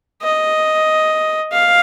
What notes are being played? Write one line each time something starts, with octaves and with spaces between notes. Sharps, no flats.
D#5
F5